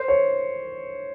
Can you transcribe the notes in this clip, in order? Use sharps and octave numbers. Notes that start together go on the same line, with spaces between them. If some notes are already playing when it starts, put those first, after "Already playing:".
Already playing: C5
C#5